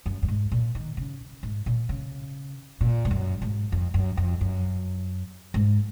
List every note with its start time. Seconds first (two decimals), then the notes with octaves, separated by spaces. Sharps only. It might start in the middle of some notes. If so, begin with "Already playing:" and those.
0.06 F#2
0.23 F#2
0.28 G#2
0.52 A#2
0.75 D#3
0.97 C#3
1.43 G#2
1.66 A#2
1.89 C#3
2.81 A#2
3.05 G#2
3.11 F#2
3.42 G#2
3.72 F2
3.94 F#2
4.17 F2
4.41 F#2
5.54 G#2